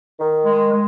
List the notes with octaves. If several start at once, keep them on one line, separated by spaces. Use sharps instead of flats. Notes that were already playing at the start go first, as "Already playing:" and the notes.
D#3
G#3
G#3